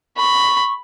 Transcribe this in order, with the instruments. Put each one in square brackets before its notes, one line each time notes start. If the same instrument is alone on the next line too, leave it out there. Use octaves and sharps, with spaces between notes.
[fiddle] B5 [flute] C#6